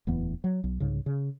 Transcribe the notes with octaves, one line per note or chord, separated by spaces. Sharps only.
D1 E2 E3 B3
F#3
B1
C2 G#2 C#3
C#3